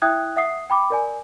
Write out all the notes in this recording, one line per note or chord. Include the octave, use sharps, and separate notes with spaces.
E4 E5 G5 D#6 F#6 G#6
E5 F#5 D#6 C7
G5 B5 D6
A#4 D5 G#5